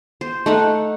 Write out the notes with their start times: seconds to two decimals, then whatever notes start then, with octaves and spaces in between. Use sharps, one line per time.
0.21 C5
0.46 A3 D#4 F#5